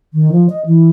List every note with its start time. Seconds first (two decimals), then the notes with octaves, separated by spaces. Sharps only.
0.13 D#3
0.32 F3
0.49 D#5
0.66 E3